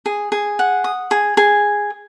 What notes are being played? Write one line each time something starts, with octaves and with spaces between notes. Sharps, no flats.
G#4
G#4
F#5
D#6
G#4
G#4